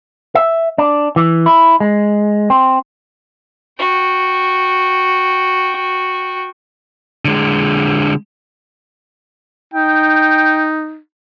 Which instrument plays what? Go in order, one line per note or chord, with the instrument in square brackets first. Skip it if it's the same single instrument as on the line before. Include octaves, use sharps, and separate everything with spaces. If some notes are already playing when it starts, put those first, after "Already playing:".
[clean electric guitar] E5
D4
E3
E4
G#3
C4
[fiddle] F#4 G5
[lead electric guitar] D3 G#3
[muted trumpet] D#4 [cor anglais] G5